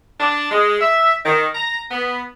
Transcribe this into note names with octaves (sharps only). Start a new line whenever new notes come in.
D4
G#3
E5
D#3
A#5
B3